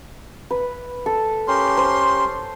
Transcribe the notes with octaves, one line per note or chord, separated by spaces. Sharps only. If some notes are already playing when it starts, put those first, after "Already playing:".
B4
A4
C#4 G4 A#4 C6
C5